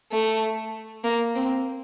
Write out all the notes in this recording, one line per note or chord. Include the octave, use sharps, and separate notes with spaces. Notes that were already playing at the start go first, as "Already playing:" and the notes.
A3
A#3
C4